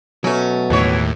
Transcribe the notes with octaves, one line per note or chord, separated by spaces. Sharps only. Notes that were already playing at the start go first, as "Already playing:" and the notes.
B2 F#3 A3 C#4
D#2 A2 E3 C#5